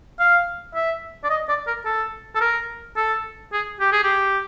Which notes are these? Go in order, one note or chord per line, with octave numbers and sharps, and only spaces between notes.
F5
E5
D5
D#5
D5
A#4
A4
A4
A#4
A4
G#4
G4
G#4
G4